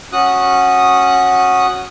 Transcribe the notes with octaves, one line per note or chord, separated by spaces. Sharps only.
C#4 F#4 D#6 F#6